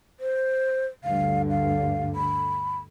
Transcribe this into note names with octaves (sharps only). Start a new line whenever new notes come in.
C5
D2 G2 D3 F5
F5
B5